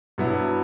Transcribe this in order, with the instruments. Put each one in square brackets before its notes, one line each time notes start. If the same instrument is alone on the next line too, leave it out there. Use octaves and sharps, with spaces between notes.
[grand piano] G2 F#3 B3 E4